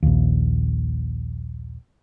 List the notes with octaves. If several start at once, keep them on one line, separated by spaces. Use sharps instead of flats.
A#1 D#2